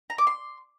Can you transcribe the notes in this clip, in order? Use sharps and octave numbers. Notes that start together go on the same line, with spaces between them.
A#5
D6
C6